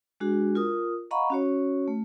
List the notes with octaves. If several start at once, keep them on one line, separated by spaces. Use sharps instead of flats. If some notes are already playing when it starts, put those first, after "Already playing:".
G#3 D4 F#4 G#4
F4 A#4 D#6
D#5 F5 F#5 A#5 B5 C#6
C#4 F#4 C#5
A3